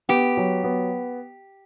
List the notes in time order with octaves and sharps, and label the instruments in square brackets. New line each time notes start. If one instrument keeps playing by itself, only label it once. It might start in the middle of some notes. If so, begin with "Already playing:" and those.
[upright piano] B3 [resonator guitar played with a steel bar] G4
[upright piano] F#3
B3